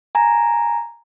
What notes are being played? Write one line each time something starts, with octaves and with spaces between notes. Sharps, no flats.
G#5 A#5